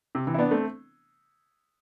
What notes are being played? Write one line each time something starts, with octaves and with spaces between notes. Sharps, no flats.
C3
C3 E3
E4
B3 D4
A3 C4